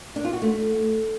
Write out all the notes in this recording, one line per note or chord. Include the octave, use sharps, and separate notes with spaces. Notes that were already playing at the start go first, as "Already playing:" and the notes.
D4
F4
F#4
A3